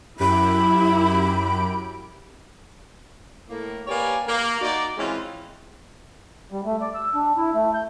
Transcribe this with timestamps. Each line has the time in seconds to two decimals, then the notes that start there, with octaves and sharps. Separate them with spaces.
0.20 F#2 E4 G4 B5 D7
3.49 A2 A#3
3.87 A#3 G4 B4 C#5 D5 G#5
4.27 A#3
4.61 D#4 F#4 D5
4.97 E3 G#3 C4 C#4 E4 F4
6.51 G3
6.65 A3
6.81 D5
6.95 E6
7.15 D4
7.37 E4
7.54 A3
7.74 G6